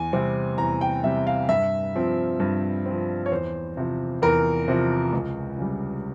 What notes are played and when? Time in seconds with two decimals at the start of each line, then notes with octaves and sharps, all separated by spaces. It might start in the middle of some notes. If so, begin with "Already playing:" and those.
Already playing: E2 G#5
0.13 C3 G3 C4
0.58 E2 A#5
0.81 G5
1.04 C3 G3 C4 E5
1.27 F5
1.49 G2 E5
1.95 F3 C4
2.40 G2
2.86 C4
2.91 F3
3.26 C#5
3.32 E2 C5
3.77 C3 F3
4.22 E2 A#4
4.68 C3 F3
5.12 C#2
5.58 C#3 G3